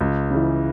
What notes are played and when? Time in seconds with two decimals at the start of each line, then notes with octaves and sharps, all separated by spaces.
0.01 C#2
0.31 C#3 E3